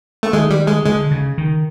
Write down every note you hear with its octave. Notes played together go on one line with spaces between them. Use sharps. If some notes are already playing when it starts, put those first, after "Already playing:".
A3
D#3 G#3
G3
G#3
D3 G#3
C#3
D#3